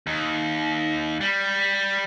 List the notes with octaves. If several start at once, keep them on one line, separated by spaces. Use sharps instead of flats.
D#2
G3